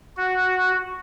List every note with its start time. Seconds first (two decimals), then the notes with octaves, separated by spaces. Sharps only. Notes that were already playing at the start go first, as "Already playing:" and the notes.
0.17 F#4